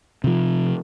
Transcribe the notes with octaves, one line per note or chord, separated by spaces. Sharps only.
C3 F3